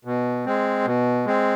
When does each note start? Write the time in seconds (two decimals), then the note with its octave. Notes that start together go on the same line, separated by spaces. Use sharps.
0.05 B2
0.46 G#3 C4
0.85 B2
1.26 G#3 C4